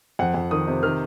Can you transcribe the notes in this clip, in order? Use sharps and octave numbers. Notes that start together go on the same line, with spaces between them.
F2 F#5
F2
D#3 D#6
C3
D#3 F6